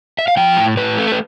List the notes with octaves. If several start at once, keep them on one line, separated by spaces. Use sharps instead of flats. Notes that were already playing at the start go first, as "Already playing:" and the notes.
E5
F5
F3 G5
A2
A2 B4
A3
B4